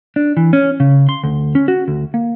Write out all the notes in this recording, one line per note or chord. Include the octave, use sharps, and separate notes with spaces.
D4
E3
C#4
C#3
C6
D2
C#4
F#4
D2
A#3